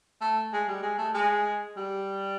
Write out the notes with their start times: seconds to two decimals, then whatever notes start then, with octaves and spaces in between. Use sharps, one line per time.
0.21 A3
0.53 G#3
0.68 G3
0.83 G#3
0.98 A3
1.14 G#3
1.76 G3